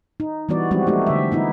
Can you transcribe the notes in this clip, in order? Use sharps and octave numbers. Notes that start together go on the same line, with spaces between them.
D#4
E3 G3 B3 F#4 D5
F3 G3 G#3 C4 D#4 F#4
A3 D#4 F#4 G4
D3 E5
B3 D#4 E4